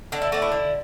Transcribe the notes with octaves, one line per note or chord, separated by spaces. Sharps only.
D3 D4
E4
A3 D4 F#4
E4
D3